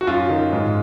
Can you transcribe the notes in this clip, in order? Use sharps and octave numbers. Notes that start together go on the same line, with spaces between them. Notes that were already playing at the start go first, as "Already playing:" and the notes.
F#4
F#2 F4
D#3
G#2